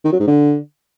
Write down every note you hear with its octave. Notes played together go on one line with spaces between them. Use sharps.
D#3
F#3
G#2
D3